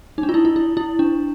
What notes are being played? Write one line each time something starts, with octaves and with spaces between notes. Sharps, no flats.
D#4
D4
F4
E4
F4
E4
E4
D4